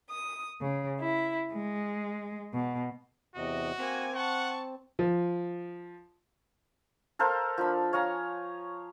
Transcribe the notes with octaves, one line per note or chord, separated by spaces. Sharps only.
D#6
C#3
E4
G#3
B2
E2 C3 F#4 D#5
A#3 C4 G#5
F#5 A5 C#6
F3
A4 A#4 C5 F5
F3 D4 B5
C#5 F5 G#5 A#5